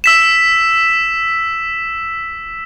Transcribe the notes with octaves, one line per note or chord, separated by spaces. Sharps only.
E6 B6 E7